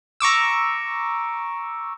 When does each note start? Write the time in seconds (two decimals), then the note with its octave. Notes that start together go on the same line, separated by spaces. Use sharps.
0.20 A#5 C#6 D6 E6